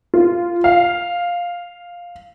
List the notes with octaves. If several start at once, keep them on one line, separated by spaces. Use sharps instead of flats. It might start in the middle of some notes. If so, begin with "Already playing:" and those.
F4
F5